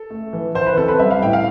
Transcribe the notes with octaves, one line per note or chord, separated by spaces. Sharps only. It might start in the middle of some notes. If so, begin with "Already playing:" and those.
Already playing: A4
A3
E3
E3 C5
B4
C4 A4
B4
G3 E5
F5
A2 G5
F5